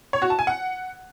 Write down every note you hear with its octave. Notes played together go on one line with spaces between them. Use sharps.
C#5
F#4
A5
G#5
F#5